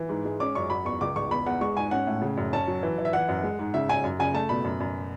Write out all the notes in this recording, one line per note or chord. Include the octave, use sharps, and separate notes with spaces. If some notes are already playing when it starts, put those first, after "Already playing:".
Already playing: E3
G#2
G#3
C#4 D6
F#2 C#6
F#3 B5
E2 C#6
C#2 D6
C#2 C#6
E2 B5
E2 F#5
G#3 C#6
G#2 G#5
C#4 F#5
A2
C#3
F#2
C#4 A5
F#3
E3
E3
E5
E3 F#5
F#2
G#3
G#2
C#3 E5
C#4 G#5
F#2
C#3 G#5
A3 A5
B2 B5
F#2
F#2